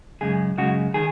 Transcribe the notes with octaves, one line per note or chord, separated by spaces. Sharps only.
F#2 C#3 G#3 G#4
F#2 C#3 G#3 F#4
D#3 G#4